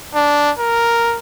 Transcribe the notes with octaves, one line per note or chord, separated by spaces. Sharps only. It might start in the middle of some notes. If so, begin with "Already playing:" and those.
D4
A#4